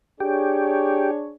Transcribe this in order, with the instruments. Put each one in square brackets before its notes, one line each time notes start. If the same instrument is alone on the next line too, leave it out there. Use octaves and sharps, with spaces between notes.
[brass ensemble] D4 G#4 C#5 [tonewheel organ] G4